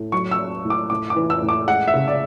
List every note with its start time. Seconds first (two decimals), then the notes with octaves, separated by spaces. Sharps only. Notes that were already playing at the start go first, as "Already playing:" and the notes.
Already playing: A2
0.12 F#3 C#6
0.31 E6
0.39 F#3
0.65 A2
0.70 D6
0.90 A2 D6
1.10 D6
1.16 E3
1.30 E6
1.42 A2
1.49 D6
1.68 G#3 F#5
1.88 E5
1.94 C#3
2.08 D5